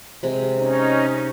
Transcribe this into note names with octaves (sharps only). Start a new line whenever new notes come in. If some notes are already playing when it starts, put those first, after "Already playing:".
C3 G#3
C#4 D#4